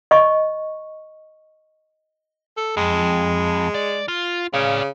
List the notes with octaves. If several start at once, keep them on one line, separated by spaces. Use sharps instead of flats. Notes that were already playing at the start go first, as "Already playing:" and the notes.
D#5 C#6
A4
F2 G#3
D5
F4
C#3 D5 F5